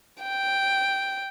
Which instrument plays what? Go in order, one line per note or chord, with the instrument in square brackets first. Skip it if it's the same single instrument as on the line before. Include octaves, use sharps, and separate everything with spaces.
[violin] G5